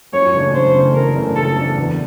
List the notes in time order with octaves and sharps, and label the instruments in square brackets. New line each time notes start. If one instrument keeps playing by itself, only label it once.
[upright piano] F#2 [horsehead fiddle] C#5
[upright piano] C#3 E3 A3 D4
[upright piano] F#2 [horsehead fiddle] C5
[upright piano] C#3 E3 A3 D4
[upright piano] F#2 [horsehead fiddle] A#4
[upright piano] C#3 E3 A3 D4
[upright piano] F#2 [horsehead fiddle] A4
[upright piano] C#3 E3 A3 D4
E2